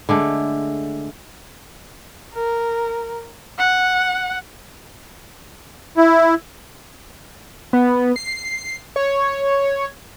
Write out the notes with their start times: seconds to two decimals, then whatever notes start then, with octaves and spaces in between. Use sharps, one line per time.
0.09 D3 G#3 A3
2.33 A#4
3.58 F#5
5.97 E4
7.73 B3
8.16 C7
8.96 C#5